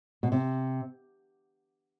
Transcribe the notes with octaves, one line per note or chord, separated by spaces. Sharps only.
B2
C3